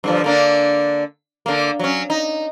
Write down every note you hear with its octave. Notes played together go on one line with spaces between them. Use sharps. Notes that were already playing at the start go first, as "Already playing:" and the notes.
G2 D3 F3
D3 A#3 D4
D3 A#3
F#3 C#4
D#4